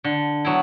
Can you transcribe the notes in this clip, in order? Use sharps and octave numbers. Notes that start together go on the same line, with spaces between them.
D3
F#3 B3 E4